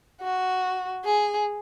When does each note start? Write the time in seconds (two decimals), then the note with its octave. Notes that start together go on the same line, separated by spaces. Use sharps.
0.21 F#4
1.05 G#4